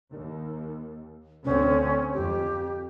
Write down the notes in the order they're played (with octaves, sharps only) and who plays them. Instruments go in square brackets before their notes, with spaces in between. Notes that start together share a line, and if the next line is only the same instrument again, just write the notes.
[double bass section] D#2
[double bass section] D2 D3 C4 [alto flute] C#4
[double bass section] F2 [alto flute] G4